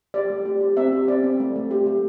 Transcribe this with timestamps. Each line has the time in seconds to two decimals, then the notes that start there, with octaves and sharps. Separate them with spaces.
0.14 G4 D5
0.30 A3
0.46 G4
0.61 G4
0.77 C4 E5
0.93 G4
1.08 C4 D5
1.24 C4
1.40 A3
1.56 A3
1.71 G4
1.86 A3